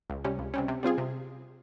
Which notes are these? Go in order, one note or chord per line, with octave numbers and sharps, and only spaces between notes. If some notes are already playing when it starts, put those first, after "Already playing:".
C#2
C3 G3 C#4
C#2
C3 G3 C#4
C3
G3 C4 F4 G#4
C3